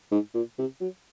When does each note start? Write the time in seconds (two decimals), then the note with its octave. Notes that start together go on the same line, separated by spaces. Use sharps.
0.12 G#2
0.35 A#2
0.59 C3
0.81 F#3